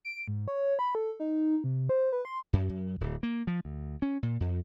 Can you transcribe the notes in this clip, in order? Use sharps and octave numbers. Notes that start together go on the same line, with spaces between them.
D7
G#2
C#5
B5
A4
D#4
C3
C5
B4
C6
F#2
F#2
D1
A#3
F3
D2
C#4
A#2
F2